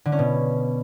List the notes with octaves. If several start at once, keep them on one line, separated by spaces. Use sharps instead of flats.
D3
C#4
B2